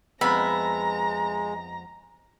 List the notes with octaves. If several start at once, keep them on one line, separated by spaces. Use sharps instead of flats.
F2 G#3 B3 E5 A#5 B5